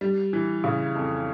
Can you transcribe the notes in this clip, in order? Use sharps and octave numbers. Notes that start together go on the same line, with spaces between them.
G3
E3
C#3
F2